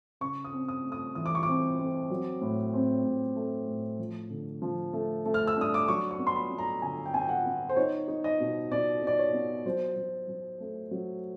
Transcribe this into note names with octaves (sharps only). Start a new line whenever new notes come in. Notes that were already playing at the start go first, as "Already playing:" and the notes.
C#3 C#6
D#6
C4
D#6
A3
D#6
E3 D#6
D6
C#6
C4 D6
C4
F#3
A2
C4
A2
A3
A2
F3
D3
F3
A3
A3
F6
E6
D4 D#6
D6
F#3 C#6
C#6
B3
C6
B5
B3
A#5
D3 G#5
G5
B3 G#5
G5
F#5
B3
C5
D#4 C#5
D#4
D#5
B2
B2 D5
D#4
D5
C#5
B3
F#3 C5
F#3
F#3
A3
F#3